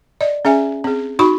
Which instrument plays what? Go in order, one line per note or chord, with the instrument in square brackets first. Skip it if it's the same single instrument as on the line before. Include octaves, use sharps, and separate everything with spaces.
[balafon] D5 D#5
C#4 G#4 E5 G#5
C4 G#4
D#4 F#4 B5 C#6